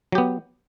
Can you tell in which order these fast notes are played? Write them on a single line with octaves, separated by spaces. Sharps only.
F#3 G4 B3